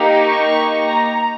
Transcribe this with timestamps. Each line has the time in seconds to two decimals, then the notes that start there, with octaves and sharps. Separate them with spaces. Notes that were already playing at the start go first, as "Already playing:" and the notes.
Already playing: A#3 D#4 G4
0.20 C#6
0.87 A#5